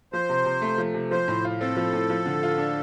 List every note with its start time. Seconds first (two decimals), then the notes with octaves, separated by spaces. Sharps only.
0.13 F3 C5
0.29 C3
0.45 C3
0.62 A3
0.78 F3
0.94 C3
1.11 F3 C5
1.28 A2
1.44 F4
1.60 C4 A4
1.77 F3
1.93 A2
2.10 F3
2.26 D3
2.43 F4
2.58 D4